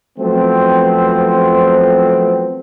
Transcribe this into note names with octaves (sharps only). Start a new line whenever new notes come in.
F3 F#3 A3 B3 C4